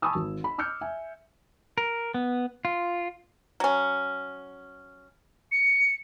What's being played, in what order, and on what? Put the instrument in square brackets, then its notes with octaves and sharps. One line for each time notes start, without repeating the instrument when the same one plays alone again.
[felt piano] G#5 A5 B5 C#6 D#6 E6
G#1
B5
D6 E6 F6 G6 C#7
E5 G#5
[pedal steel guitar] A#4
B3
F4
[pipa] F#3 C#4
[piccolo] C#7